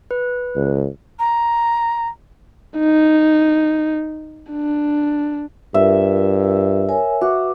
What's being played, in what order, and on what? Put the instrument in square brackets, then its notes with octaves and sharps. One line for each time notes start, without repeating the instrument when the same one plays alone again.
[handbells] B4
[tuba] C#2
[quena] A#5
[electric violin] D#4
D4
[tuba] G2 [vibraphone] F4 A#4 [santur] E5
[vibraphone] A#4 C#5 G#5
[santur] F#4 [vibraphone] B4 E5 D6